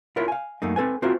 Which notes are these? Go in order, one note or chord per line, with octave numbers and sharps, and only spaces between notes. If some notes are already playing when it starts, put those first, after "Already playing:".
E4 F4 A#4 C#5 E5
F5 G#5
F#2 A3 A#3 D#4
C4 A4 B4 G#5
C4 F4 F#4 A#4 C5 E5